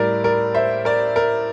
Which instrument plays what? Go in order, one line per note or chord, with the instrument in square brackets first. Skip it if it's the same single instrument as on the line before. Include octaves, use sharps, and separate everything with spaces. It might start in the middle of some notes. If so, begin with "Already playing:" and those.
Already playing: [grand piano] A2 G3 A#4 D5
A#4 D5
C5 E5
A#4 D5
A#4